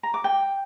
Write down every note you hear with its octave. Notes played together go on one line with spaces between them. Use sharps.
A#5
D6
G5